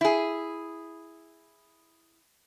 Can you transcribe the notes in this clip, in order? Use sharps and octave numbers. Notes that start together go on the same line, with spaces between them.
E4 G#4